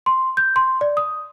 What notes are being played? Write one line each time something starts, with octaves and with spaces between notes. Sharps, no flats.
C6
G6
C6
D5
D#6